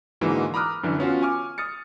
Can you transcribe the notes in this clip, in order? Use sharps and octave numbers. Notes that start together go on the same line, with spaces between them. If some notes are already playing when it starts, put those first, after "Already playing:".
G#2 D3 E3 G#3 A#3 F#4
A#5 B5 D6 D#6 F6 F#6
F#2 D3 E3
B3 C#4 F4 F#4
G#5 C#6 D6 F6
D#6 F6 A6 C#7